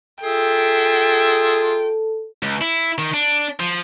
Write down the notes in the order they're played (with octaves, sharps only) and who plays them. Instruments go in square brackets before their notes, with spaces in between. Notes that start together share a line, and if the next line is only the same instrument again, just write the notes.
[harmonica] F4 G#4 E5 [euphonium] A4 [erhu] G5
[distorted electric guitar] C#2
E4
D#3
D4
F3